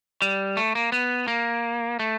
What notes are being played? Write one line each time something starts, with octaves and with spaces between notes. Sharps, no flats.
G3
A3
A#3
B3
A#3
A3